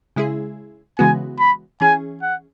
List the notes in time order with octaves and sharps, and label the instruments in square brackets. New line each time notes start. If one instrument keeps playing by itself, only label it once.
[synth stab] C#3 G#3 E4 G#4
[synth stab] C#3 E3 G#3 B3 F#4 [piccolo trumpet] G#5
[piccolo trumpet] B5
[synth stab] E3 C#4 G#4 [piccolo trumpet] G#5
[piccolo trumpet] F#5